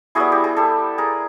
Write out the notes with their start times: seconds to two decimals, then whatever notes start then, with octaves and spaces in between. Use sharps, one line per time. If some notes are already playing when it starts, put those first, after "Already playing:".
0.15 G3 B3 E4 F#4 G#4
0.32 G4
0.44 G#4
0.57 G4 A4
0.98 G#4 A#4